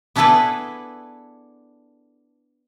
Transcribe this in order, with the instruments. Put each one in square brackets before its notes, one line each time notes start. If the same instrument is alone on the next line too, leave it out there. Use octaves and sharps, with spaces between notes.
[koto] B3 D4 E4 G#4 A4 B4